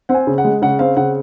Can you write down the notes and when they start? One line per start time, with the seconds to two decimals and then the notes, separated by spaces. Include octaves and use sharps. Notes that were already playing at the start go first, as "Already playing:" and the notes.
0.09 C4 F#5
0.15 G#5
0.27 C#3
0.38 F#5
0.45 G#3
0.62 C#3 F#5
0.79 C4 F5
0.97 C#3 F#5